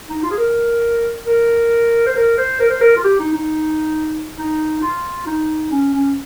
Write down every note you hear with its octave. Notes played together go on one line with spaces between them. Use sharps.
D#4
F4
G#4
A#4
A#4
C5
A#4
C5
A#4
C5
A#4
F4
G4
D#4
D#4
D#4
F4
D#4
C#4
C#4